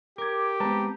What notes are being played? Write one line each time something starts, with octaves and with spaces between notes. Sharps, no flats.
G4 A#4 D6 G#6
G#3 B3 C4 B4 A5 A#5